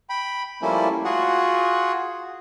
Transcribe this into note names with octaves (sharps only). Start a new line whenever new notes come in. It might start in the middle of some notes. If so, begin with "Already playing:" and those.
G5 B5
F3 G3 A3 A#3 C#4 E4
F4 F#4 G#4 F#5